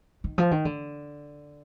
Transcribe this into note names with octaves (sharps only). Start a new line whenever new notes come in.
D#3
F3
D#3
D3